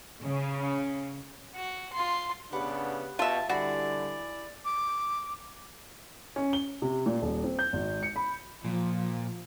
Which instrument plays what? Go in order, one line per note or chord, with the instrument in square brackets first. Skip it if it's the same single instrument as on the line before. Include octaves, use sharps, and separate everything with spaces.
[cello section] C#3
[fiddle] F#4
F4 C6
[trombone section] C#3 B3 D4 [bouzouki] G4 B4 F#5
[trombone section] B2 [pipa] F4 E5 [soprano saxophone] A5
[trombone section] D3 G3 [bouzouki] E4 G#4 [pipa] F#4 [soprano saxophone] D5
[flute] D6
[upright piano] C#4
G7
C3
A#2
D#1
C4
G6
G#1
C#7
B5
[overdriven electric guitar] A#2 [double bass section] F3